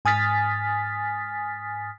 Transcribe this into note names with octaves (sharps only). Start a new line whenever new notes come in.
G#2 G#5 D#6 F6 A6 B6